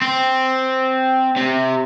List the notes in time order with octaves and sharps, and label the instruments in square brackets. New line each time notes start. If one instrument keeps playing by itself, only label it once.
[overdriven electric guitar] C4
C3